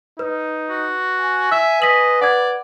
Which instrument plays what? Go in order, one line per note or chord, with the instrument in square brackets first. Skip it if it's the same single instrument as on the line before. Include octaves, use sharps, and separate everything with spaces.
[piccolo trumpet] D#4 [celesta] B4
[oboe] F#4
[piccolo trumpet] G#5
[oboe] E5 [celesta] E6
[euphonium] B4 [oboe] D#5 [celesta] B6 F#7
[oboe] D5 [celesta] F#5 G#6